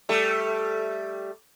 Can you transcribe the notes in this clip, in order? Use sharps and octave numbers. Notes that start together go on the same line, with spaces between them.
G3 A3